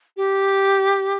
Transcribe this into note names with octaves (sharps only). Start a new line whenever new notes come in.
G4